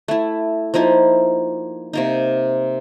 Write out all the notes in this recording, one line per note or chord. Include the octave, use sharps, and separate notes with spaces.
A3 E4
F3 A#3 D#4 E4
C3 A#3 D#4